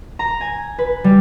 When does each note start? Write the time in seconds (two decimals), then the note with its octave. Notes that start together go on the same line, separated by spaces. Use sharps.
0.19 A#5
0.41 G#5
0.79 B4
1.04 G3